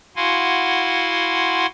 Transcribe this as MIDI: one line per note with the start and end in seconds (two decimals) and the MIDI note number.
0.16 1.66 64
0.16 1.66 66
0.16 1.66 77
0.16 1.66 78
0.16 1.66 80
0.16 1.66 84